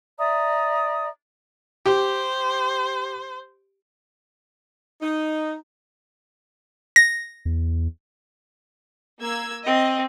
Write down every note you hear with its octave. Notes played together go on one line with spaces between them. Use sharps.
D5 E5 A#5 D#6
G4 C5
D#4
A#6
E2
A#3 E6 G#6
C4 D#5